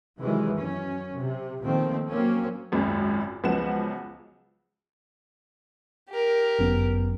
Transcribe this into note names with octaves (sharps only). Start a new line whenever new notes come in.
C3 D#3 E3 F#3 G#3
F#2 C#4
C3
A#2 D#3 F3 A3 C4
F#3 A#3 C4 C#4
G#1 C#2 F#2
C#2 F3 F#3 B3 F#5 E7
G4 A#4
G1 F#2 B3